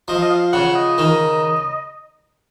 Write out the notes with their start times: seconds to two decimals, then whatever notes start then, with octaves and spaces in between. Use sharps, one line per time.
0.08 F3 D#5
0.15 F5
0.22 D#5
0.30 F5
0.53 C#3 F#5
0.75 D#5
0.98 D#3